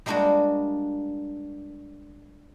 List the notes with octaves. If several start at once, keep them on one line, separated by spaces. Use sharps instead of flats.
G3 G#3 A#3 D4 F4 F#4